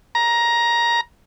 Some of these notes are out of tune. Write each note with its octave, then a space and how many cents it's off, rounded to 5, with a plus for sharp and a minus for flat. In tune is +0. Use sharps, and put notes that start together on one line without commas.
A#5 +15